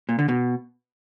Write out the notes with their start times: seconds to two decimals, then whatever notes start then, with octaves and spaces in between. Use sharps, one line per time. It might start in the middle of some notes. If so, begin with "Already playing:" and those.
0.09 A#2
0.19 D3
0.29 B2